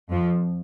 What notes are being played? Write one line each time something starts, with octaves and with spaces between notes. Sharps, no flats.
F2 F3